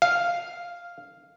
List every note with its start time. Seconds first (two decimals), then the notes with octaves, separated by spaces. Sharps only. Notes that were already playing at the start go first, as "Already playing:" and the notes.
0.02 F5